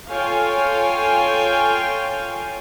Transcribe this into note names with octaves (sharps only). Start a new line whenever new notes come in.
F4 A4 C#5 F5 G5 G#5